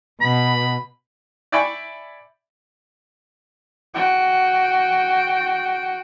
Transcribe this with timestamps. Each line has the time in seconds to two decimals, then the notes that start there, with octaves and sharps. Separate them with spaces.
0.21 B2 B5
1.52 D5 E5 G5 G#5 B5 C#6
3.94 F#4 G5